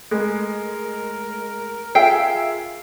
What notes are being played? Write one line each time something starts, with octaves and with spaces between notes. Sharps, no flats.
G#3 A3 A#4
F4 G#4 E5 G5 C7